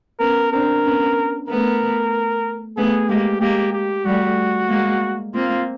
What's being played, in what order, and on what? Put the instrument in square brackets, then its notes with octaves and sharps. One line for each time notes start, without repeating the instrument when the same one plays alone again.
[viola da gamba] B3 C#4 [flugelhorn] A#4
[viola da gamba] C4 D4 [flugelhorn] A#4
[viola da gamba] B3 C#4
[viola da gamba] A3 B3 [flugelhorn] A#4
[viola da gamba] A3 B3 [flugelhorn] G#4
[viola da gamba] G#3 A#3 [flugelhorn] G4
[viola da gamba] G#3 A#3 [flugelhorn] G4
[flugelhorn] G4
[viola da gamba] G3 A3 [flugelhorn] F#4
[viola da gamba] G#3 A#3
[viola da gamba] A#3 C4 [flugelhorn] F4